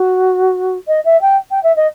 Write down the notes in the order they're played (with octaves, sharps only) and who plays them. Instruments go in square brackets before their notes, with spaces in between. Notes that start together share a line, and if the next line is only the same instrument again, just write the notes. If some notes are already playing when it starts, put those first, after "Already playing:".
Already playing: [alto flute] F#4
D#5
E5
G5
G5
E5
D#5